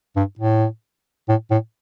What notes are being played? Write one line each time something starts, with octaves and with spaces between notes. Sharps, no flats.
G2
A2
A2
A2